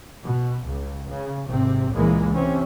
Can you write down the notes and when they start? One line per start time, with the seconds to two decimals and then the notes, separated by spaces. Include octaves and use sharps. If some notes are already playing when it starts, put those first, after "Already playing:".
0.25 B2
0.66 C#2
1.10 C#3
1.47 G#1 C3 C4
1.93 C#2 A#2 E3 G#3 A#3
2.34 C3 C4 C#4